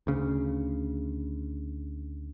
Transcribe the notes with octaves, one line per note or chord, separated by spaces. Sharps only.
D2 C#3